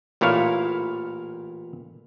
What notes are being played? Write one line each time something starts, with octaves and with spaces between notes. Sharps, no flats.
A1 A#2 E4 C#5 F5